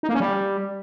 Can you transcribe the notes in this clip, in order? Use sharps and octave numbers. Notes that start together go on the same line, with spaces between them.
D#4
A#3
C#4
G3